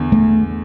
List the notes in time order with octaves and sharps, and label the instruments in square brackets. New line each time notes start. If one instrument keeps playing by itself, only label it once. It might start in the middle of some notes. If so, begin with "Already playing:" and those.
Already playing: [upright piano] E2 D3
[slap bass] A3